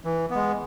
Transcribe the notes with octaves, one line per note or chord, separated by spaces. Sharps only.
E3
G#3 B3